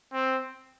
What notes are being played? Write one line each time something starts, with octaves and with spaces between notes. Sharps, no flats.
C4